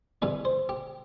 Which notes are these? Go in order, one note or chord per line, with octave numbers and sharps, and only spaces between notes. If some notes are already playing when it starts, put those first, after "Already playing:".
G2 E3 G3 B4
C5
G4